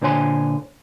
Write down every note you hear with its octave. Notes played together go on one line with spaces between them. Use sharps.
A#2 D3 C5 C#5 G#5 C6